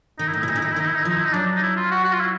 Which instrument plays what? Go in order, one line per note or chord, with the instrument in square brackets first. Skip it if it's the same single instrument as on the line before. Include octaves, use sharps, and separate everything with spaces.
[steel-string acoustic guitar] D#3 [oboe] D#4
[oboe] E4
[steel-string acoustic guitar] A2 [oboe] D#4
[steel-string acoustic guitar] B2 [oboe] E4
[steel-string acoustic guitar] A#2 [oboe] D#4
[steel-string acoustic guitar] D3 [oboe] E4
[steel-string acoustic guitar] D#3 [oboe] D#4
[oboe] E4
[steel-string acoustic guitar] D#3 [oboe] D#4
[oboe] E4
D#4
E4
[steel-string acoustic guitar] F3 [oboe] D#4
[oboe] E4
D#4
[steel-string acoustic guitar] F#3 [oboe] D4
[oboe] D#4
E4
F4
F#4
F#4
F4
E4